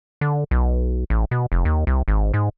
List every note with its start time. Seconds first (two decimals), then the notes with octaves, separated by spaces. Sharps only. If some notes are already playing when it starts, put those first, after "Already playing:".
0.21 D3
0.51 B1
1.10 A1
1.31 B2
1.52 F1
1.65 D#2
1.87 C2
2.08 G#1
2.34 G#2